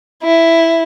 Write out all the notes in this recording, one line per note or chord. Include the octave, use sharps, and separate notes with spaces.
E4